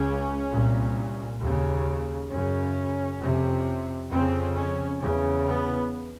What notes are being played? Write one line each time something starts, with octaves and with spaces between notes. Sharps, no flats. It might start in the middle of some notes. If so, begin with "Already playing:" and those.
Already playing: C#2 C#3 C#4
C2 A#2
D#2 C#3
F#2 C#3 C#4
F2 C3
F2 C#3 C4
C#4
E2 C#3
B3